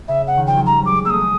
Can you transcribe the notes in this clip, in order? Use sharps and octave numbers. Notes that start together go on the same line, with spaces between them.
C#3 E5
F#5
D#3
F3 G5
F#3
G3 A#5
G#3 D6
A#3 E6
A3 D#6
G#3